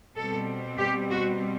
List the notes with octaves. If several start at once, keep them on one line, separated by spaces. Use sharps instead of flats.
B2 G3 C4 A4
G4
F#4